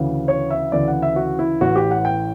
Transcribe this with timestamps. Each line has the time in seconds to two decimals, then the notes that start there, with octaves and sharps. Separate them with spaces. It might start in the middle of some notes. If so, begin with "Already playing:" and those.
Already playing: D2 C#3 E3
0.28 C#5
0.50 E5
0.72 D2 C#3 E3 D5
0.88 F#5
1.02 E5
1.16 F#4
1.39 E4
1.61 A1 A2 E3 F#4
1.76 G4
1.91 F#5
2.05 G5